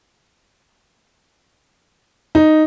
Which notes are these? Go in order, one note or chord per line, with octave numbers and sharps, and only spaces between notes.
D#4